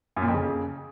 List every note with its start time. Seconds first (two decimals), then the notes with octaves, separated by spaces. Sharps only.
0.16 F#2
0.22 A#2
0.28 F2
0.34 C#3